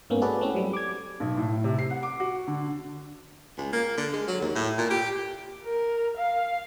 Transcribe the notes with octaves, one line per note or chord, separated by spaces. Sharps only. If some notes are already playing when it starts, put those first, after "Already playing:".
G#2 A#3 B3 C#4
F#4 G#4 A4 B4 D5
A3 C4 C#4 E4
F#3 G3
D6 G#6
B1
A2
C3
C7
F#5
D6
F#4
D3
C#2
A#3
D3
G#3
F#3
D#2
A2
A#2
G4
A#4
F5